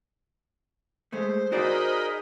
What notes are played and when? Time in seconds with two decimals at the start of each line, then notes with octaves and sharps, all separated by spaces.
1.12 G#3 A3 C5
1.52 D#4 F#4 G#4 A#4 D5 D#5 B5